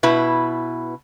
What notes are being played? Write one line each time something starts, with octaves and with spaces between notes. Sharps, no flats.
B2 E4 B4